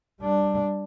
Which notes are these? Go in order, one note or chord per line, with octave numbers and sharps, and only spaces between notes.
G3 D4